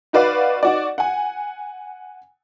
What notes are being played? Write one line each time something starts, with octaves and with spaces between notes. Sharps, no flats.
D#4 F#4 B4 D5 F5
D#4 F#4 D5
F#5 G#5